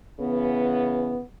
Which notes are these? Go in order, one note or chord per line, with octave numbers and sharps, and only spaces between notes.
C#3 E3 B3